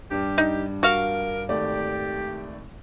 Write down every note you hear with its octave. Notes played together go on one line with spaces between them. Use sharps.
G2 G3 G4
D#4
F#4 A#4 F5
G#1 A3 G4 D5